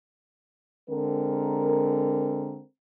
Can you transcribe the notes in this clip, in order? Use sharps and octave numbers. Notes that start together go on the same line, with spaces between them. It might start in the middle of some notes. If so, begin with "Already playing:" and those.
D3 G#3 C4 A#4